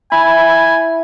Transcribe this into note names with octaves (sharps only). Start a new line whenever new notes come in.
E4 G#5 B5